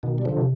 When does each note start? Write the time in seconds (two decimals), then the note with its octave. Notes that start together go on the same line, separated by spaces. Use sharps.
0.03 B2 D#3
0.18 G3
0.25 D3 F3
0.37 C3